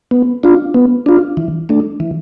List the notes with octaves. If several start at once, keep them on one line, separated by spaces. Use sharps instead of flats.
B3
D4 F4
B3
D4 F4
E3
A3 D4
E3